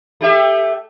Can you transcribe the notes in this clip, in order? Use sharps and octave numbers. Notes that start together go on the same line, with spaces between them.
A3 G4 E5